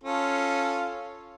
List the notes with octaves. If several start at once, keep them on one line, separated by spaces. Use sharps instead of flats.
C#4 F4 A4